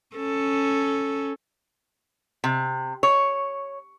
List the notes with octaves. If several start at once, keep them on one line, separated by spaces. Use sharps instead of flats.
C#4 A4
C3
C#5